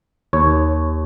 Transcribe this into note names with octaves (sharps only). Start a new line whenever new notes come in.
D#2 C#5